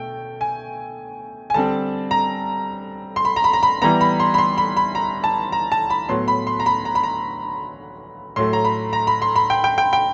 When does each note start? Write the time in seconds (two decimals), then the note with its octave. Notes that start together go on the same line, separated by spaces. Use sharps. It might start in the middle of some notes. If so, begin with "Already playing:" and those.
Already playing: B2 A3 G5
0.41 G#5
1.50 G#5
1.54 D3 G3 C4 A5
2.11 A#5
3.16 C6
3.25 B5
3.36 A#5
3.44 B5
3.53 A#5
3.63 B5
3.82 E3 G3 B3 A#5
4.01 B5
4.20 C6
4.34 B5
4.38 C6
4.58 B5
4.77 B5
4.95 A#5
5.24 A5
5.52 A#5
5.72 A5
5.90 B5
6.09 A2 F#3 B3 C6
6.28 B5
6.47 C6
6.60 A#5
6.66 B5
6.85 A#5
6.95 B5
7.03 A#5
8.36 A2 F#3 A3 C6
8.53 A#5
8.65 B5
8.93 A#5
9.07 B5
9.22 C6
9.36 B5
9.50 G5
9.64 G5
9.78 G5
9.93 G5